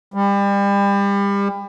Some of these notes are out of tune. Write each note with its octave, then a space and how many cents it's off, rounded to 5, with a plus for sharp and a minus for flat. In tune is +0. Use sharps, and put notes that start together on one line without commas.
G3 +30